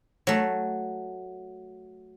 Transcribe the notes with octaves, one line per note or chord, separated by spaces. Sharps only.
F#3 A3